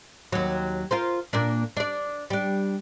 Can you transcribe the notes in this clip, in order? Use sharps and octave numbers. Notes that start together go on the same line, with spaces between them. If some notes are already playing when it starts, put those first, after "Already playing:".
D#2 F#3
F4 A#4 C5
A#2 A#3 D4
D4 D5
G3 D4